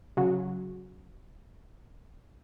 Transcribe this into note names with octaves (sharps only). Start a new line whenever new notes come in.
C#3 F#3